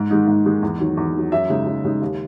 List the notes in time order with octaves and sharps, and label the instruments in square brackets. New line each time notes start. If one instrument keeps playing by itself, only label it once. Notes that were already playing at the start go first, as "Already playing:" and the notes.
Already playing: [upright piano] G#2
D#3 G#3 D#4
G#2
D#3 G#3 D#4
E2
D#3 F#3
E2
D#3 F#3
F#2 E5
C#3 G#3 D#4
F#2
C#3 G#3 D#4
D#2